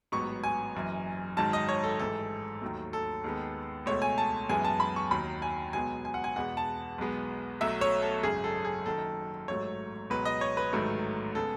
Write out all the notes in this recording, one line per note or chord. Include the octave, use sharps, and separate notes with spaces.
A1 G#2 F#3 B3 C#6
G#5
F#1 F#2 E3
G#1 G#2 D#3 F#3 A5
D#5
C#5
A4
A1 G#2 E3 A4
D#2 D#3 F#3 A3
A4
D#2 D#3 G#3 B3
C#2 B2 A3 C#5
G#5
A5
F#2 E3 G#3 B3 G#5
A5
B5
C#6
D#2 D#3 F#3 B5
G#5
C#2 B2 F#3 B3 G#5
G#5
F#5
G#5
E2 B2 G#3 B3 F#5
A5
B1 B2 G#3 B3
B1 B2 F#3 A3 E5
C#5
A4
G#1 F#2 C#3 G#4
A4
G#4
F#1 F#2 D#3 A4
A1 G#2 F#3 A3 C#5
C#2 B2 F#3 B4
D#5
C#5
B4
A1 G#2 D#3 F#3 A3
C#3 G#3 B3 A4